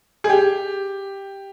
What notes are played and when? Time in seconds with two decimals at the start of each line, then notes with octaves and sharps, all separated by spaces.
0.24 G#4
0.29 G4